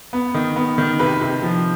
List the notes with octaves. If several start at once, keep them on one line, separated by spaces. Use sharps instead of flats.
B3
D#3
B3
D#3
C3 B4
C3
F3